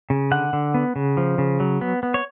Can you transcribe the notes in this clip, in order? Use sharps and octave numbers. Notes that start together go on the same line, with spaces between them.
C#3
D3 F#5
D3
B3
C#3
F3
C#3
F#3
B3
B3
C#5